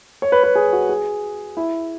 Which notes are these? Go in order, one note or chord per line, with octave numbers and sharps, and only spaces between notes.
C#5
B4
B4
G#4
F#4
G#4
E4